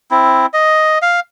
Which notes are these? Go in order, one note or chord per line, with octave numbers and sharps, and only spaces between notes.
C4 E4
D#5
F5